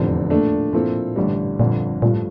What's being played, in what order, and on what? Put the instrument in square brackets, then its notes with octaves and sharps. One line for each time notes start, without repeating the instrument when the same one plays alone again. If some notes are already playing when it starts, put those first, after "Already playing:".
Already playing: [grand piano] F1 E2 D3 F3 C4 [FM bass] A2
[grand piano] A#2 A3 D4 A4
[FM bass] G2 [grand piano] A#2 F3 C4 E4 A4
[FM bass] A2
[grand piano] A1 G2 D3 G3 [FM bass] A#2
[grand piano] G1 F2 D3 F3 [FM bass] A#2
[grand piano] G2 F3 A3 [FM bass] A#2
[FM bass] A2